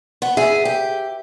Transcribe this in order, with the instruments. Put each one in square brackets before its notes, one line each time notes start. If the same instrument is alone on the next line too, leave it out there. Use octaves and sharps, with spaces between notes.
[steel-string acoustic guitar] B3
[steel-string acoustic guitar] G#4 [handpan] E5
[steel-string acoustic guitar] G4